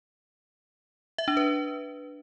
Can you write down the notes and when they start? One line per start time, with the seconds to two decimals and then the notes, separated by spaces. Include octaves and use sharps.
1.18 E5
1.28 D4
1.37 B4